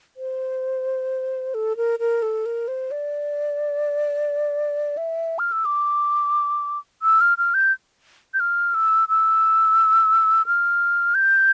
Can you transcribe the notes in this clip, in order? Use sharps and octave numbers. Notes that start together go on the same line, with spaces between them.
C5
A4
A#4
A#4
A4
A#4
C5
D5
E5
F6
E6
D6
E6
F6
F6
G6
G6
F6
E6
E6
F6
G6